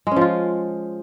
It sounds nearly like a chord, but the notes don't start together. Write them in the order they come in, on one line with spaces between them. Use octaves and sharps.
G#3 C#4 F3 F4